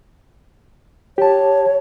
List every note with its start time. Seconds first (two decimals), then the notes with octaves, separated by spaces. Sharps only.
1.18 G4 C#5 A5